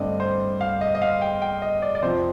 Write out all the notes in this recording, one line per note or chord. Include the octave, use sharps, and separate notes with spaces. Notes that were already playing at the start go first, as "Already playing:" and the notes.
Already playing: G2 D3 A3 C4 D5 D#5
C5
F5
D#5
D#5
F5
G5
G5
D#5
D5
D5
F2 C3 F3 C5